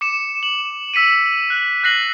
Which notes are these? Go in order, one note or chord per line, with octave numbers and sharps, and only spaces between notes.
D6 C#7 E7
F#7
E6 B6 C#7 D#7
F#6
F#6 A#6 C7 F#7